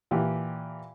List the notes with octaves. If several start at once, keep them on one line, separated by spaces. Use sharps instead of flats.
A#2 E3 G4